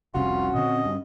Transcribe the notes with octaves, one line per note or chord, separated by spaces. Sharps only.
F1 C2 C3 C#4 F4 F#4
A#2 D3 C4 D#5
G2